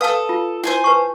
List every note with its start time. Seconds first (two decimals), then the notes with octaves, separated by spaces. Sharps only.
0.01 A4 B4 F5 A5 D#6
0.29 F4
0.64 E4 C5 G#5 C6
0.84 B4 A5 C#6